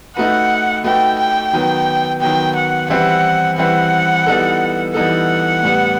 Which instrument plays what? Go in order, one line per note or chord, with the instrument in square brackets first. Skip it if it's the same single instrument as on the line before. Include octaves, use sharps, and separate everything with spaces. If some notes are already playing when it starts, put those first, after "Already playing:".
[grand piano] A3 D#4 F#4 B4 [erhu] F#5
[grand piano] A3 D#4 F#4 B4 [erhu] G5
[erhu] G5
[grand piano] D#3 F#3 B3
[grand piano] D#3 F#3 B3 [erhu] G5
[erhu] F#5
[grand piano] E3 G3 C4 E4 B4 [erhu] F#5
[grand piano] E3 G3 C4 E4 B4 [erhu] F#5
[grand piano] E3 G3 B3 D#4 A4
[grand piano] E3 G3 B3 D#4 A4 [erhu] F#5
[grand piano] A2 G3 B3